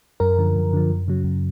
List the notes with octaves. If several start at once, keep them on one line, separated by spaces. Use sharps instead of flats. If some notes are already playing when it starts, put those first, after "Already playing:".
F#2 A#4
D3 F3
F#2
D3 F3
F#2
C#3 F#3
F#2